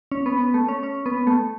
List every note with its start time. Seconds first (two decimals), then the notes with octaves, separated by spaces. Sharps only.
0.12 C#4
0.26 B3
0.40 B3
0.54 A3
0.68 C#4
0.83 C#4
1.06 B3
1.27 A3